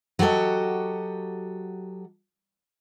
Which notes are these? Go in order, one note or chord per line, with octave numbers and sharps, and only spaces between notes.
F#3 F#4 G4 A4 D#5